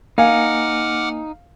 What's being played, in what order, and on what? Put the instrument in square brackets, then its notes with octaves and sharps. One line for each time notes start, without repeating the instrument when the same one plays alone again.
[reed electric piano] A#3 G#5 [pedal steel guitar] D#4 [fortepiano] F5 [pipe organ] F#5 D6 F6